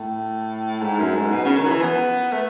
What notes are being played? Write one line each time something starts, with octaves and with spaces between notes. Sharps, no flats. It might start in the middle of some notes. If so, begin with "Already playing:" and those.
Already playing: A2
G#2
F#2
G#2
B2
C#3
D#3
F#3
E3
B3
A3